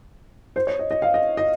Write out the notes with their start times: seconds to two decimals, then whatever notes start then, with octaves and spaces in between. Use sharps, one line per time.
0.56 C5
0.67 C#5
0.79 D#5
0.91 D#5
1.02 F5
1.14 D#5
1.37 D#5